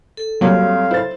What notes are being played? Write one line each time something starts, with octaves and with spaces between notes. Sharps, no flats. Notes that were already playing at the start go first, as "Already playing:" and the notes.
A4
F2 F#3 G3 A#3 C4 C#5 F5
E4 C5 A6